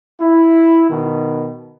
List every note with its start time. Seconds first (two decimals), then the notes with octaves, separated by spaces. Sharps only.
0.20 E4
0.90 B2 D#3